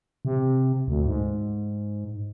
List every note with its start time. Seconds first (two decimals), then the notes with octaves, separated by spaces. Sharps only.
0.25 C3
0.88 D2
1.06 G#2